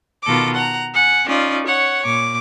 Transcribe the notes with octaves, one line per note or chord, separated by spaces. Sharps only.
B2 D#3 F4 A4 D6
F#5 A#5
F#5 G#5
C#4 D#4 F4 D5
C#5 F#5
A#2 D6